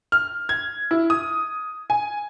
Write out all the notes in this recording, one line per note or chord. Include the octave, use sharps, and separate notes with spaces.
F6
G#6
E4
D#6
G#5